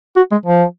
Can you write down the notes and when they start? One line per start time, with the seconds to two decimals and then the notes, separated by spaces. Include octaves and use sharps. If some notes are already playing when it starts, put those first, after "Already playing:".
0.16 F#4
0.32 G#3
0.46 F3